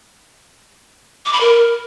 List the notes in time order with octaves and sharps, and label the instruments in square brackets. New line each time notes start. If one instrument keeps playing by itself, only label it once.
[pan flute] D6
B5
A#4